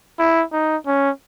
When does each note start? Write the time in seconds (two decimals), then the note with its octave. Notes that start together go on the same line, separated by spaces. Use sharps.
0.19 E4
0.53 D#4
0.86 C#4